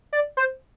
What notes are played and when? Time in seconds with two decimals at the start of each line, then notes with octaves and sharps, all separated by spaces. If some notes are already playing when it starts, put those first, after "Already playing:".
0.13 D5
0.37 C5